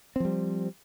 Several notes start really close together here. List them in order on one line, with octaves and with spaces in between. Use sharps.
C4 F3 G3